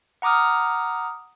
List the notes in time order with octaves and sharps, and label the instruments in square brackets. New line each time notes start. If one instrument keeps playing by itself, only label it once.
[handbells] F#5 A#5 D6 D#6 F6